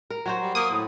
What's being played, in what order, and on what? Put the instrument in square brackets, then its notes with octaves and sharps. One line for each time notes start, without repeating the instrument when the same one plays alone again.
[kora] A#4
F#3 F#4 C5
[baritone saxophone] G3
[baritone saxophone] A#3 [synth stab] D#6
[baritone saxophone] A2